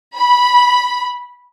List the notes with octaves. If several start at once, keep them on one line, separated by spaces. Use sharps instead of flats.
B5